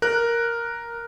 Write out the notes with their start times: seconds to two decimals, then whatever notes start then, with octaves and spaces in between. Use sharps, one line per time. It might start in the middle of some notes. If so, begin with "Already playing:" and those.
0.02 A#4 F#6